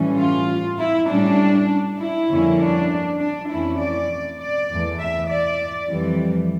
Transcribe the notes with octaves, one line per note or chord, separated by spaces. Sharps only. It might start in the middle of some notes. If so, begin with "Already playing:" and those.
Already playing: A2 E3 G3 C#4
F4
E4
A2 G3 C#4 D4
E4
F2 D3 G3 A#3 C#4
D4
D4
F2 E3 A3 C#4 E4
D5
D5
E2 E3 A3
E5
D5
F2 E3 G3